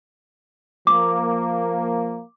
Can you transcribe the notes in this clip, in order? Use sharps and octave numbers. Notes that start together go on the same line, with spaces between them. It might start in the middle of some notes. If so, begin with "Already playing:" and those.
F3 A#3 D6